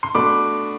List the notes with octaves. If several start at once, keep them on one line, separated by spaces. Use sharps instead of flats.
C6
B2 A3 D4 B5 D6